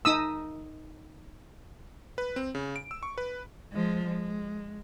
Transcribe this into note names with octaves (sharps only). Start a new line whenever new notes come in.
D#4 D#6 E6
B4
C4
C#3
D7
E6
C#6
B4
F3 G#3
G#3